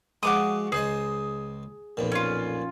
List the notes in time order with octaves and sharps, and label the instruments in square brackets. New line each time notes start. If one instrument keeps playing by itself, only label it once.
[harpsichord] F3 G#3 [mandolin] F#4 D6 D#6
[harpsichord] C#2 C5 D#5 [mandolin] G#4
[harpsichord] B1 F2 A#2
[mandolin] C#4 F4